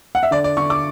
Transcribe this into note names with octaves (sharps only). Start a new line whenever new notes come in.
F#5
E5
D3 D5
D5
D3 C#6
D6